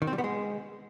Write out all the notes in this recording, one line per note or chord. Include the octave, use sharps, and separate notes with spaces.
D#3
C4
G3
B3
G#3